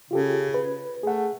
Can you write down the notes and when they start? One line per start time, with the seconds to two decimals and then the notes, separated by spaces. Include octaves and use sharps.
0.11 C#3 F4 G4 A4
0.54 B4
1.03 A3 G#4 F#5